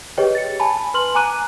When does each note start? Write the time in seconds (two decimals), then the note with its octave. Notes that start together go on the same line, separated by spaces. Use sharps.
0.18 G4 G#4 B4 C#5 D#5 G5
0.35 A6 C#7
0.60 G#5 A5 B5
0.94 B4 C6 F6 F#7
1.15 G#5 A#5 D6 F#6 D#7